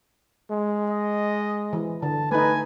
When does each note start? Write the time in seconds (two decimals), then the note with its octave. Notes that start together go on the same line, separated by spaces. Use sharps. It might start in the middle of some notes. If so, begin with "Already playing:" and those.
0.51 G#3
0.90 D#5
1.73 E3
2.02 D3 A5
2.31 A3 D#4 B4 G#5